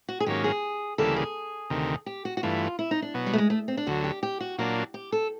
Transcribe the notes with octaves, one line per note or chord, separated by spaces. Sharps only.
F#4
G#4
G#2 D#3 F#3 A#3 C#4 G4
G#4
D2 C#3 E3 G3 A#3 A4
G#4
D2 C3 D#3
G4
F#4
F#4
G2 E3 A3 F4
E4
D#4
D4
B2 F#3 B3
G3
A3
G#3
A3
C4
D4
D2 D3 F#3 F#4
G4
G4
F#4
A#2 F#3 A#3 D4 F#4
G4
A4